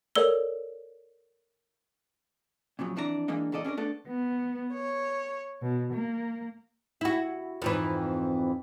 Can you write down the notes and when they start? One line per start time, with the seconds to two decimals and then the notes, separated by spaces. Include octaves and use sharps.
0.15 A4 A#4 C#5 D5 E6 G7
2.79 A#2 C#3 F3 F#3
2.96 F2 E3 D4 F#4 A#5
3.28 E3 G#3 A#3 D4 D#4
3.52 E2 A#2 A4 D5 D#5
3.65 C#4 D4 G#4 A#4
3.77 A3 B3 D4 A4
4.07 B3
4.72 C#5
5.62 B2
5.93 A#3
7.01 E4 F#4
7.62 F2 G#2 E3